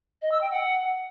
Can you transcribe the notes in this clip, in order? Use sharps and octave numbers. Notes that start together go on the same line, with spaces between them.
D#5
E6
G5
F#5